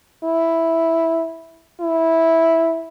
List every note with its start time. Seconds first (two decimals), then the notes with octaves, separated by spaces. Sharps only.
0.24 E4
1.81 E4